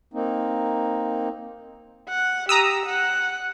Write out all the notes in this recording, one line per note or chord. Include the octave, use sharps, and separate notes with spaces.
A#3 C4 D#4
F#5
G4 A#5 D#6 E6
F#5